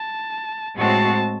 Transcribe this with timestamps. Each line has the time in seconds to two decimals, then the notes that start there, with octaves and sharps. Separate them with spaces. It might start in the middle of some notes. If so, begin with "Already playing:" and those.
Already playing: A5
0.77 A2 G#3 C4 F#4 A5